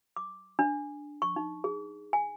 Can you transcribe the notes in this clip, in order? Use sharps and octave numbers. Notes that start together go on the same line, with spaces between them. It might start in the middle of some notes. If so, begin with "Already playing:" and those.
D6
D4
C#6
D#4
G#4
G#5